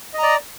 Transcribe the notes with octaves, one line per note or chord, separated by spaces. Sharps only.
D5 D#5 A#5